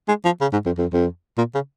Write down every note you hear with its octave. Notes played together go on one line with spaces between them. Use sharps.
G#3
F3
C#3
G#2
F2
F2
F2
A#2
C#3